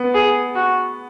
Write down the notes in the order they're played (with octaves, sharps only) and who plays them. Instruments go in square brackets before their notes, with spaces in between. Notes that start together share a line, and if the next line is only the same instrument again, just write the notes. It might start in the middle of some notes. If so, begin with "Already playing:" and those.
Already playing: [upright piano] B3
[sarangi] G#4
F#4